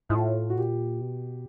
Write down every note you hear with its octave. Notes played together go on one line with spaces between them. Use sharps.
G#2 E4
A2 F4
F#4
A#2 G4
B2